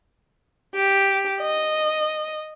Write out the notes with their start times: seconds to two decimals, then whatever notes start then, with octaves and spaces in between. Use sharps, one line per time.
0.75 G4
1.41 D#5